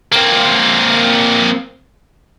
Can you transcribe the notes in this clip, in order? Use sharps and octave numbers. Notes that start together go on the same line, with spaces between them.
A#3 C4